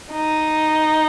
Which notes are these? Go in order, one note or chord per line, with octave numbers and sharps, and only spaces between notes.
D#4